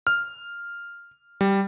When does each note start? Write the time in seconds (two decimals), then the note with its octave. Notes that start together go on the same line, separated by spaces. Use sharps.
0.07 F6
1.41 G3